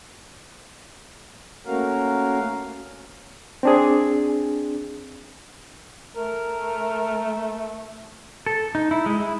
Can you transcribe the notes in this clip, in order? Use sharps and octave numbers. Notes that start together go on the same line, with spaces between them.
A3 A#3 C#4 F#4 A#4 F5
C4 D4 G#4
A3 A#4
A4
D#4
E4
G#3
E4